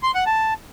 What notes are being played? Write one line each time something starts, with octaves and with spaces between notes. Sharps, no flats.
C6
F#5
A5